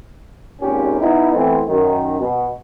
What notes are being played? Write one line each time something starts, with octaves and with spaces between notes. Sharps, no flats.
G#1 D#2 A#2 C#4 G4
B3 D#4 E4
E3 A3 B3 C4
F#2 D#3
B2